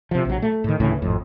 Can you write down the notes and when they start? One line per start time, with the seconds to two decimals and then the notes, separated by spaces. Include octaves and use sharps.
0.11 C3 F3
0.25 A#1 F#3
0.42 A3
0.64 A2 D#3
0.80 D2 A2 C#3 E3
1.02 G#1 F2 A2